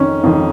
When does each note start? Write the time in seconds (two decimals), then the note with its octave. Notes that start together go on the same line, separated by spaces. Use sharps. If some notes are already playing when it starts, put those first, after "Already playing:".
Already playing: F2 D#3 C#4
0.24 F2 D#3